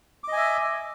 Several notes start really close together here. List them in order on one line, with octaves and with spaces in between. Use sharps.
D6 D#5 G#5 E5